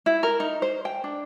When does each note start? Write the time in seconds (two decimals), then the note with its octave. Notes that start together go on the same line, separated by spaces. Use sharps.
0.06 E4
0.23 A#4
0.40 D#4
0.62 C5
0.85 G5
1.04 D4